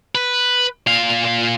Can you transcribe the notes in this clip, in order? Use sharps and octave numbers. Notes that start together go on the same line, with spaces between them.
B4
A#2 F5